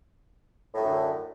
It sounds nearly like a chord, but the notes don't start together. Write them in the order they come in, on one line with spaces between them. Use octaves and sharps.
A2 F#3 F#2 D3